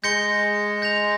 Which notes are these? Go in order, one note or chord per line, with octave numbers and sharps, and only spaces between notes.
G#3 G6 A#6 C#7 G7
G6 A#6 F7